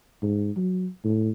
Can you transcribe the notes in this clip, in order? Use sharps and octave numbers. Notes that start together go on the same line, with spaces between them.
G#2
F#3
A2